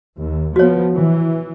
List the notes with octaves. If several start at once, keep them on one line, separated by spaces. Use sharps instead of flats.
D#2
F3 B3 F#4 C#5
E3